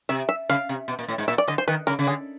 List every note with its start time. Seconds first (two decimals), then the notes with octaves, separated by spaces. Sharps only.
0.09 C3 E5
0.29 E5
0.49 C#3 F5
0.69 C3
0.88 B2
0.99 A#2
1.09 A2
1.18 G#2
1.28 A#2 E5
1.38 D5
1.48 D3 D#5
1.58 C5
1.68 D#3 B4
1.87 C#3 A#4
1.99 C#3
2.07 D3 G#4